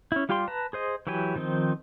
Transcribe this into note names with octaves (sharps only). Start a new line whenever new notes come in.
C#4 E4
G3 F4 G4 G5 C6
B4 A5 A#5
G#4 C5 D#5
E3 F#3 E4 G4 G#5
D#3 F3 C4 D#4